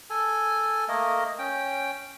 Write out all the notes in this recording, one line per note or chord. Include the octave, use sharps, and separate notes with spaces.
A4 G#5
A3 A#3 A#4 D#5
C#4 G5